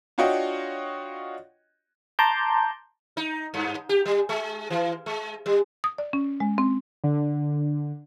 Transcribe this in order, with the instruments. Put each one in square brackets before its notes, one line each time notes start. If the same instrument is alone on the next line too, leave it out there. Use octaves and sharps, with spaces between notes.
[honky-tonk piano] D4 F4 F#4 C#5 D#5 G5
[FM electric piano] A5 A#5 C6 D6 G6
[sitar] D#4
G2
G4
G3
G#3
E3
G#3
G3
[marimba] D#6
D5
C#4
G#3
C4
[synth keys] D3